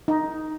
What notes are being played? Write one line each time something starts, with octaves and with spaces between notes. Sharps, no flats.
D#4